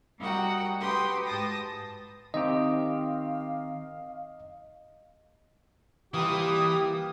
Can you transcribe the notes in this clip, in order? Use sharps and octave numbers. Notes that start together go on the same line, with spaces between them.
G3 F#4 A#4 D#5 F#5 G5
F#4 G4 B4 G5 C6 D#6
G#2 A5 D#6 A#6
D#3 C4 G4 D#5 F5
E3 G3 A#3 F4 G4 D#6